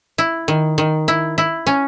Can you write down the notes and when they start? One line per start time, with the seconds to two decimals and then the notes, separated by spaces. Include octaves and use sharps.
0.18 E4
0.48 D#3
0.78 D#3
1.08 E4
1.38 E4
1.67 C#4